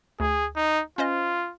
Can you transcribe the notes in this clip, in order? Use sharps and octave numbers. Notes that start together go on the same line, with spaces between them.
D2 G#4
D#4
C#4 F4 C5 D#5